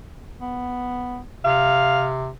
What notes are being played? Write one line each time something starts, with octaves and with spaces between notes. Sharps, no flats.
B3
C3 F5